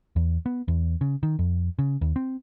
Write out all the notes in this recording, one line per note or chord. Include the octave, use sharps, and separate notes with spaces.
E2
B3
E2
C#3
D#3
F2
C#3
D#2
C4